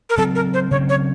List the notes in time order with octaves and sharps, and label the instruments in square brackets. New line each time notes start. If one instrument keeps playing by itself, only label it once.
[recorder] A#4
[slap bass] C#3 F#3 C4 [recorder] A4
[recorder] A#4
C5
[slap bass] C#3 F#3 C4 [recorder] C#5
[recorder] C#5